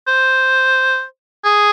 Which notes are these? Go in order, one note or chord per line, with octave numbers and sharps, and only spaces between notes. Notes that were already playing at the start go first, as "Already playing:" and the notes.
C5
G#4